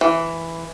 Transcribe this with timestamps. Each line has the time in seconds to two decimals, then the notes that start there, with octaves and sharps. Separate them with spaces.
0.01 E3